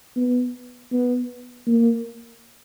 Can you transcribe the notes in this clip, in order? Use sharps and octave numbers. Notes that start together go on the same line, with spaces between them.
B3
B3
A#3